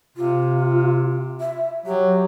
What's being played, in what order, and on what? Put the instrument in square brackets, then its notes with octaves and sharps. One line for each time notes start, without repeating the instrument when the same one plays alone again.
[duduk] C3 [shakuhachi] F4
[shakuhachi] E5
[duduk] F#3 [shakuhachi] G4